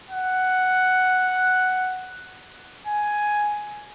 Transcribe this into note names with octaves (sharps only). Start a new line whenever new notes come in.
F#5
G#5